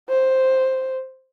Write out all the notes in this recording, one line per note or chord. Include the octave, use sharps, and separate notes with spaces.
C5